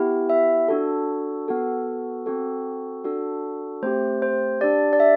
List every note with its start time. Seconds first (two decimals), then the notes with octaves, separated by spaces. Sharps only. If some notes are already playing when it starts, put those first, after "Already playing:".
Already playing: B3 E4 G4
0.29 E5
0.68 D4 F#4 A4
1.48 B3 F#4 A4
2.26 C4 F#4 A4
3.04 D4 F#4 A4
3.82 A3 C4 G4 C5
4.22 C5
4.61 D4 G4 D5
4.93 D5
5.00 E5